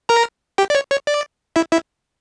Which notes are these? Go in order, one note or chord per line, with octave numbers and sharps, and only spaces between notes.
A#4 A#5
G4 G5
D5
C#5
C#5
D5
E4 E5
E4 E5